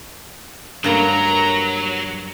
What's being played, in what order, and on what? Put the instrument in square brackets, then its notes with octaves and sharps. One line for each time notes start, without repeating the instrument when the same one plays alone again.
[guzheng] G2 A#3 B4 [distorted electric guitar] F#3 [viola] A#5